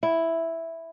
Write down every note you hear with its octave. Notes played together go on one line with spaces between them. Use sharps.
E4